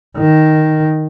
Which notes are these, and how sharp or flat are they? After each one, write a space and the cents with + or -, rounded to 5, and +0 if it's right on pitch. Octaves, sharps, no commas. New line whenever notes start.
D#3 +0